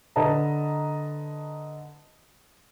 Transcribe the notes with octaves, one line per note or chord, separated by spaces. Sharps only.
D3 B4 D#5 A5 A#5